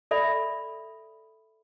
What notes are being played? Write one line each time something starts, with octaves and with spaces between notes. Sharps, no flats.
A4 D5 E5 B5